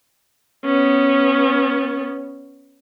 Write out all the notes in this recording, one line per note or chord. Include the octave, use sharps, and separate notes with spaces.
B3 C#4